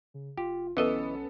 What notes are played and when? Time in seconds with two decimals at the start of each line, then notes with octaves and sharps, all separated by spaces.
0.14 C#3
0.38 F#1 F4 G4
0.77 B1 E3 B3 C#4 A4 D#5 E5